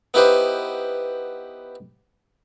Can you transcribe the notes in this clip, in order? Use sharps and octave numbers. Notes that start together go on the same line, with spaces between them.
B3 D#4 E4 G4 B4 C5